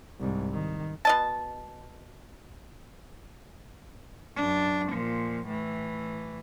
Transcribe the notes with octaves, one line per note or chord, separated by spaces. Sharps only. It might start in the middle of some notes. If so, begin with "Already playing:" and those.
C2 G#2
D#3
B2 D#5 A5
F#2 D4
A#2 F3
A2 E3